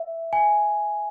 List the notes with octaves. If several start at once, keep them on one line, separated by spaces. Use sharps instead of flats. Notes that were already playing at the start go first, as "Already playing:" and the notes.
Already playing: E5
G#5